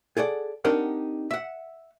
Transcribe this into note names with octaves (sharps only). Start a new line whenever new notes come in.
G#4 A4 D5 F#5
C4 D4 D#4 G4 A#4 F#5
E5 F#5